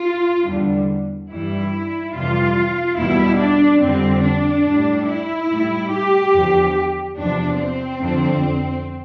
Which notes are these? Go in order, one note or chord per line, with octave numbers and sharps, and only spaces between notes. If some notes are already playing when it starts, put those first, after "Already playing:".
Already playing: F4
E2 D3 G3
G2 E3 G3 E4
F2 C3 E3 G3 F4
E2 B2 G3 E4
D4
F2 D3 G3 C4
D4
A2 G3
E4
A2 G3
G4
E2 D3 F3
E2 C3 F3 D4
C4
F2 D3 F3